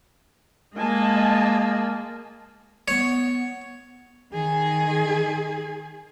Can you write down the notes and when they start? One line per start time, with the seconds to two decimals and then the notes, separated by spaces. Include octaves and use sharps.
0.76 G#3 A#3 D#5 G#5 A5
2.88 B3 C#5
4.33 D#3 G#4